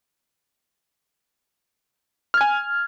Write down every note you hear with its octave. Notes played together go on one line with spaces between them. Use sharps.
G#5 F6 G#6